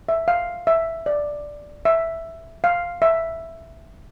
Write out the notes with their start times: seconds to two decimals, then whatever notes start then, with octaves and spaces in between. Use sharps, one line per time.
0.09 E5
0.28 F5
0.67 E5
1.06 D5
1.85 E5
2.64 F5
3.02 E5